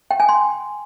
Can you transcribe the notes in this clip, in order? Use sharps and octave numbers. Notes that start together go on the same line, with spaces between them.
G5
G#5
C6